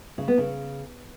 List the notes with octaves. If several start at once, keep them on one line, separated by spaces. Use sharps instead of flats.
C#3
B3
C#3